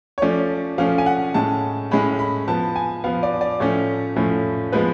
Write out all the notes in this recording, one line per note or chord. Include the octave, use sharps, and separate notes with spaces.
C#5
F3 A3 C#4 D5
F3 A3 C#4 F5
G#5
F#5
A2 G#3 C#4 A5
A2 G#3 C#4 B5
B5
F3 B3 A5
G#5
F3 B3 F5
D5
D5
A2 F3 A3 C#4 C#5
A2 F3 A3 C#4
F3 G#3 B3 B4